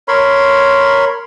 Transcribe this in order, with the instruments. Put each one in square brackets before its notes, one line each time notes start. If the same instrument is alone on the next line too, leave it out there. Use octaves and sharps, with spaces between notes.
[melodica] A#4 C#5 B5 C6